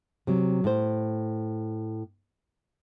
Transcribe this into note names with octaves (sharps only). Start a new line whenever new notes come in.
C3 F#3
A2 C5